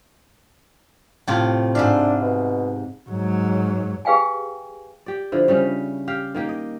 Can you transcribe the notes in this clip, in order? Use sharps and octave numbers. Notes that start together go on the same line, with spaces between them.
A2 C3 F4
G#2 D4 E5 F5
B2
G#2 F#3
G4 G#4 B4 F5 G5 G#5
G4 D5
D3 F3 E4
C#3 G3 C#4
G4 F5
D#3 A#3 G4
D#5